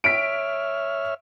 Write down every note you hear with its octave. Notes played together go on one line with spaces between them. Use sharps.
C#5 E5 F6 B6 D7